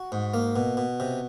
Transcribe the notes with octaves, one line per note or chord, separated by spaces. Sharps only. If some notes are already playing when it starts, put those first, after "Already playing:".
Already playing: F#4
G#2
A#3
B2
B2
C3